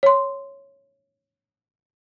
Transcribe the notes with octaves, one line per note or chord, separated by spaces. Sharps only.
C#5 C6